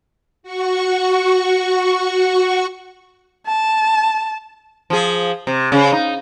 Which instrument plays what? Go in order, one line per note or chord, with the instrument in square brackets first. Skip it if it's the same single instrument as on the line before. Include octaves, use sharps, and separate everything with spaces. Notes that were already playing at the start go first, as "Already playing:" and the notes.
[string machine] F#4 C#6
[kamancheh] A5
[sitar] F3 G#4
C3
C#3
D#4